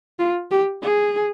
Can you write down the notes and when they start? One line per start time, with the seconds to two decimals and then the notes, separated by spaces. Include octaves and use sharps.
0.19 F4
0.51 G4
0.82 G#4